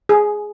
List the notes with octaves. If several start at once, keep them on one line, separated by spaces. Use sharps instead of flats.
G#4